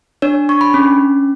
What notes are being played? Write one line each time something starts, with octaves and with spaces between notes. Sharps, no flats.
D4 C#5
D4 C#6
B5
C#4